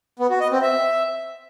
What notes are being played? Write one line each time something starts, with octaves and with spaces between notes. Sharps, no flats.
B3
F#4
D#5
C4
E5